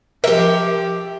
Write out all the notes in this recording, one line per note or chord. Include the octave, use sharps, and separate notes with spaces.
F3 G4 A#4 E5